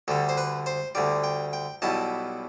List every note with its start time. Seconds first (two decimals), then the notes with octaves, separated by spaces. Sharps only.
0.08 D2 D3 G3 A4
0.29 C5
0.37 B4
0.66 C5
0.95 D2 D3 G3 D5
1.24 G5
1.53 G5
1.82 B1 B2 G3 B3 E4 A5